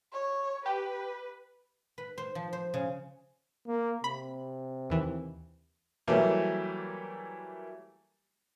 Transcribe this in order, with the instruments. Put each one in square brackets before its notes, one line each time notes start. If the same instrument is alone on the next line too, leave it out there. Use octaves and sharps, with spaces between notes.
[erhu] C#5
[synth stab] G4 [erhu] B4
[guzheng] B4
C5
F3
C5
C#3
[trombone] A#3
[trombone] C3 [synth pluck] B5
[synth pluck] D#2 E3
[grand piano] E3 F#3 G3 A3 A#3